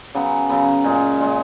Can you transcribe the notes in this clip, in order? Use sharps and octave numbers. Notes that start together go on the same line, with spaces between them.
C#3 F#3 B3
C#3 F#3 B3
A#2 G#3 C#4 G#4
A#2 G#3 C#4 G#4